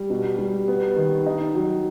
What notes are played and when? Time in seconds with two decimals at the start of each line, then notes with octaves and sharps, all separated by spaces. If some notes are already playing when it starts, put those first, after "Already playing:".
Already playing: G3
0.10 B2
0.39 G3
0.68 B3
0.97 D#3
1.26 D#4
1.55 F#3